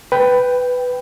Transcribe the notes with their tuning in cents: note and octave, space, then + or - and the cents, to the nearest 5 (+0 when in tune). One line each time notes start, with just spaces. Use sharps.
B4 +10 G5 +0